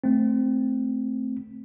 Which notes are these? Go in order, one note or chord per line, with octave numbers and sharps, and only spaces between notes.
A3 C4